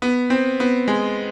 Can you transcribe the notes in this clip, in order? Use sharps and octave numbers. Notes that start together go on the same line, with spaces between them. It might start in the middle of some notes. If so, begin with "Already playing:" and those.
B3
C4
B3
G#3